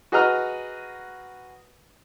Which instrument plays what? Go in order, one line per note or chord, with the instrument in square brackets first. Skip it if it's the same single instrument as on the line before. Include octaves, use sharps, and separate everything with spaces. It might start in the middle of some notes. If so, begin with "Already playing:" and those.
[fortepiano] F#4 G#4 B4 D#5 A#5 F6